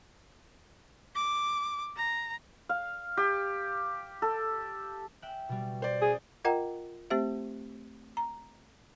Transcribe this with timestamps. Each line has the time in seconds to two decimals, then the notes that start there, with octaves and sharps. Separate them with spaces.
1.15 D6
1.96 A#5
2.69 F5
3.17 G4
4.22 A4
5.22 E5 G5 F#6
5.49 B2 G3
5.82 C5 D5
6.01 C#4 G#4
6.45 F4 A#4 D#5 F#5 G5 A#5
7.10 A3 C4 G4 C5 E5
8.17 A#5